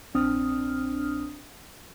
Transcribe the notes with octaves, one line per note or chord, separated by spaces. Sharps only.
A#1 C4 D4 D#6 F6